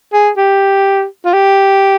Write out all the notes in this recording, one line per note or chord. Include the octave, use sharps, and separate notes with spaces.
G#4
G4
F4
G4